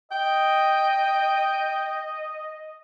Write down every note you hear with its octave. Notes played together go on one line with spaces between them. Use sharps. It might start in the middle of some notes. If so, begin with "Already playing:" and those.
D#5 G5